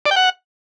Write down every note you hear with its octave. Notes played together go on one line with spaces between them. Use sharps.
D5
G5
F#5